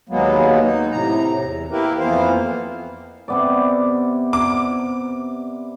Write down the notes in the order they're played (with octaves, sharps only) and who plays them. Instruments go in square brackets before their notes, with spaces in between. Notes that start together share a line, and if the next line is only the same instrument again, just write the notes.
[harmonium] D#2 F#3 G#3 A#3 B3
D#4
A2 C3 A#5
E2
A#3 E4 G4 A#4 B4
F2 E3 A#3 B3 C5 F5
[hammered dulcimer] C3 B3 D5
[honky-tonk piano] D6